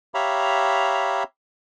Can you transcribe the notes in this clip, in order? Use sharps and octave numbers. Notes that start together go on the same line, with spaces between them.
G4 C#5 E5 F5 A#5 B5